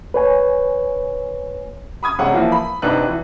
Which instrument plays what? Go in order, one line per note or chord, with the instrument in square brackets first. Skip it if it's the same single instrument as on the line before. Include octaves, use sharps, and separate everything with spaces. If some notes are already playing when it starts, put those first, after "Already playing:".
[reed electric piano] B4 C#5 G#5
[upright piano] B5 D#6 G#6
E1 C3 G#3 C#4 F#5
E3 F3 A#3 E4
B5
G#1 C3 D4 D#4 B4 F#6
E3